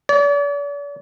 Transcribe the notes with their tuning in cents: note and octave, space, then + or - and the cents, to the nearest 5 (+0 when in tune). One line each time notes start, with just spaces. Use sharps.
D5 -45